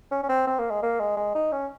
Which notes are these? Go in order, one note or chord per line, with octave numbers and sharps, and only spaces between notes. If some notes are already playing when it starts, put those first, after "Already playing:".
C#4
C#4
C4
C4
A#3
G#3
A#3
G#3
G#3
D#4
C#4